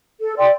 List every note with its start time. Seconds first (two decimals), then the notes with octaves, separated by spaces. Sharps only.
0.21 A4
0.37 D5 G5 C6